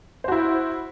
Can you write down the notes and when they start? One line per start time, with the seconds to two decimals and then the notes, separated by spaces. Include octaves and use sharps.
0.24 C5
0.28 F#4
0.32 E4